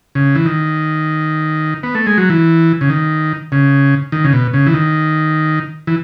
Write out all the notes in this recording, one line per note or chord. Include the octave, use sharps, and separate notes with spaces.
C#3
E3
D#3
B3
A3
G#3
F#3
E3
C#3
D#3
C#3
D#3
C#3
B2
C#3
E3
D#3
E3